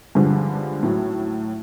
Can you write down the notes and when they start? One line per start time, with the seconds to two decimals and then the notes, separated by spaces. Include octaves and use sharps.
0.15 G2 D3 F3 G#3
0.83 A2 F#3